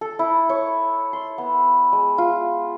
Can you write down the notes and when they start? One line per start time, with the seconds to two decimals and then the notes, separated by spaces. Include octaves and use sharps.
0.01 A4
0.19 E4
0.49 C#5
1.13 C6
1.38 B3
1.93 G#3
2.18 F4